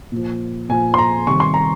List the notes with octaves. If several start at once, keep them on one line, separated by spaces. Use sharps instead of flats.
A#2 F3
A#2 F3 G#5
C6
A#5
C3 D#3 G3 C#6
C6
A#5